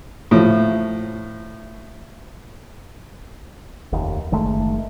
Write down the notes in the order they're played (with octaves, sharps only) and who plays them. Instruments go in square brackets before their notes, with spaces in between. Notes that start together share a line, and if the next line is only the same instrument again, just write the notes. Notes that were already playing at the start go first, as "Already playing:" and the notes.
[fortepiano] A2 F3
[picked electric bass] F1 D#2
F#1 D#3 G#3 A3